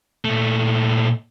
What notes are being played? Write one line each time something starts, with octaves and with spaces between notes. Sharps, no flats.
A#2 A3